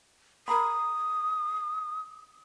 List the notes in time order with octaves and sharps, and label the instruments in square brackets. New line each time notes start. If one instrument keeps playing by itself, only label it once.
[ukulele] A#4 A#5 B5 [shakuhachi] D#6